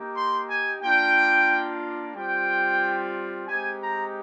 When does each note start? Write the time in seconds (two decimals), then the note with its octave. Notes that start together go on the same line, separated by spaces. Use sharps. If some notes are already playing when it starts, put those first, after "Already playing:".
Already playing: A#3 D#4 G4
0.15 C6
0.48 G#5
0.82 A#3 D4 F4 G5
2.15 G3 C4 F4 G5
3.47 G#3 C4 D#4 G4 G#5
3.80 A#5